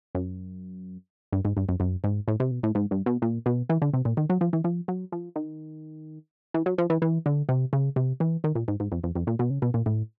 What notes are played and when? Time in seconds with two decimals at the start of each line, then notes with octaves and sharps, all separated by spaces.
0.15 F#2
1.32 G2
1.45 G#2
1.57 G2
1.69 F#2
1.80 F#2
2.04 G#2
2.28 A2
2.40 C3
2.51 B2
2.63 A2
2.75 G#2
2.91 G2
3.06 B2
3.22 A#2
3.46 B2
3.70 E3
3.82 D3
3.94 C3
4.05 A#2
4.17 D#3
4.30 F#3
4.41 F3
4.53 E3
4.64 F3
4.88 F#3
5.12 F3
5.36 D#3
6.54 E3
6.66 F#3
6.78 F3
6.90 E3
7.02 E3
7.26 D3
7.49 C3
7.73 C#3
7.96 C3
8.20 E3
8.44 D#3
8.55 A#2
8.68 G#2
8.80 G#2
8.92 F2
9.04 F2
9.16 F2
9.27 A#2
9.39 B2
9.50 C#3
9.62 B2
9.74 A#2
9.86 A2